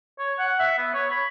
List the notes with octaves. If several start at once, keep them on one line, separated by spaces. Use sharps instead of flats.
C#5
F#5
E5
B3
C#5
B5